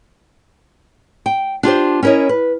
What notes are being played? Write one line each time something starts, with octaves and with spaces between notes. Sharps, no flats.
G5
D4 F4 G4 C5
C#4 E4 A#4 C#5 D#5
B4